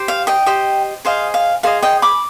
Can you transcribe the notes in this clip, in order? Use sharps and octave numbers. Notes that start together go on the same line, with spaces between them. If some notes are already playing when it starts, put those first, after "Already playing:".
Already playing: G4 C5
F5
D#5 G5
G4 C5 D#5
G#4 C5 D#5 F5
F5
G#4 C5 D#5 F5
D#5 G5
B5 D6